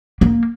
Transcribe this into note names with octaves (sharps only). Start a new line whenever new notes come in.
A#3